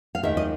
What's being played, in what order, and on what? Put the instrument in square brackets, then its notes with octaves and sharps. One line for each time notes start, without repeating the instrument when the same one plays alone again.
[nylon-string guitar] F5
D#2 D#3 G#3 E5
D#5